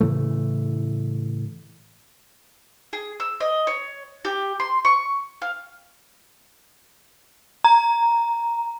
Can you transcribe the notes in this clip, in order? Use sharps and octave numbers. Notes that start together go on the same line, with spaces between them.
A2 C#3 E3 A3
G#4
E6
D#5
C#5
G4
C6
C#6
F5
A#5